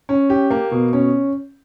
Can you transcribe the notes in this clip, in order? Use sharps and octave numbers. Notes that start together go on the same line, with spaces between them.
C#4
G4
A#3
B2
C#4